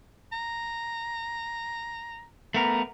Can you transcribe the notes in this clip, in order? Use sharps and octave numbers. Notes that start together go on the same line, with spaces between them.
A#5
A3 B3 A#4